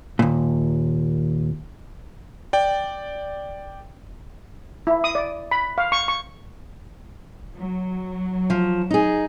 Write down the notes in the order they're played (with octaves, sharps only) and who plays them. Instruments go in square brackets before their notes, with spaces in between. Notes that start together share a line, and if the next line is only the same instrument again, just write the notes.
[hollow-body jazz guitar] D#2 A#2
[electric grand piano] D5 G5
[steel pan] E4
D#6
D5
B5
F5
C#6
C#6
[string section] F#3
[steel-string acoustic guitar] F3
D#4 G#4